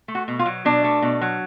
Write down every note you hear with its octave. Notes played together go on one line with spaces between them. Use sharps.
A3
F#4
B2
F4
F#3
B2 D4
A3
B2
F#3